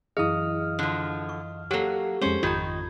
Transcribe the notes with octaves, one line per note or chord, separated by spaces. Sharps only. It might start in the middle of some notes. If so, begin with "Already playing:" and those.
F#2 E3 E4 G#4 D#5 F5 D#6 F6
D3 F3
C#6
F#3 A#3 G4 A4
F2 G#3 C#4 C5
G#1 F2 D#3 D#4 F4 A#5 G#6